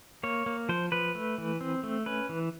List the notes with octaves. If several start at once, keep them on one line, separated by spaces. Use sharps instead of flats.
A#3 C#5
A#3
F3 C5
F3 B4
A3
E3
C4
A3
C#4 B4
E3